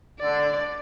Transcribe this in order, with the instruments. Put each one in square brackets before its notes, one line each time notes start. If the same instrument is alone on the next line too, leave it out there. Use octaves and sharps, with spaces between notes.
[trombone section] D3 [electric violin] D5